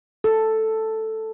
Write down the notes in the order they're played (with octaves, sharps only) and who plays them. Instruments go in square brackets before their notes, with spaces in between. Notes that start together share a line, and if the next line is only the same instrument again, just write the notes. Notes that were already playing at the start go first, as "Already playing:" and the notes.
[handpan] A4